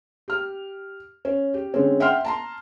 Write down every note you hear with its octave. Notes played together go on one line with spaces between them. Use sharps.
G4 F6
C#4
G4
D3 G#3 C4 C#4
E5 F#5 G5 C6 F6
A5 A#5 C6